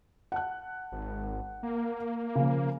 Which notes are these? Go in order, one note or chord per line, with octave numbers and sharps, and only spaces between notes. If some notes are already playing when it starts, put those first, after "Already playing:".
F#5 A5 F#6
G#1
A#3
C#3 F3